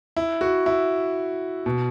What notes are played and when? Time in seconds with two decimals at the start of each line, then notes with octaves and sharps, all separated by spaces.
0.17 E4
0.41 F#4
0.66 E4
1.66 B2